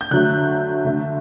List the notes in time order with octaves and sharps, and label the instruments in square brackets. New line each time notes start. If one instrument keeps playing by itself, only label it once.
[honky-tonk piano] G6
D3 F#3 A3 F#6
D3 A3